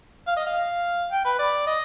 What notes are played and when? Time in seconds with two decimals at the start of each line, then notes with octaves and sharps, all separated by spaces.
0.27 F5
0.37 D#5
0.46 F5
1.11 G5
1.25 B4
1.39 D5
1.67 D#5